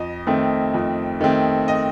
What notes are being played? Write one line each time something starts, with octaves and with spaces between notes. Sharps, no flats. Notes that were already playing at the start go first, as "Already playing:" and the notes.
Already playing: F2 D#5
D#3 A3 C4
F2
D#3 A3 C4
D#5